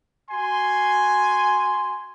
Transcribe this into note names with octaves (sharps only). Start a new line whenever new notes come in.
F#4 G#5 C6